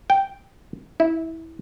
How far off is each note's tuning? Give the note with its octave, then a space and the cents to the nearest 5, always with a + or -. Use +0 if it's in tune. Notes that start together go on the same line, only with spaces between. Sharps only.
G5 -5
E4 -20